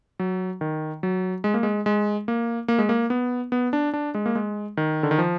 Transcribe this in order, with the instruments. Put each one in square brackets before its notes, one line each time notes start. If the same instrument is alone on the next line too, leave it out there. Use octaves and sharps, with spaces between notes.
[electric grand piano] F#3
D#3
F#3
G#3
A#3
G#3
G#3
A#3
A#3
G#3
A#3
B3
B3
D4
D4
G#3
A#3
G#3
D#3
D3
D#3
F3